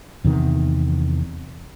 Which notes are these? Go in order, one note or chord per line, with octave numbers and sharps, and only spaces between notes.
E2 C3 D#3